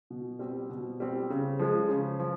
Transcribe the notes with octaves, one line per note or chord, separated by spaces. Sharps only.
B2
G3 C4
B2
G3 C4
C#3
F3 G#3
C#3
F3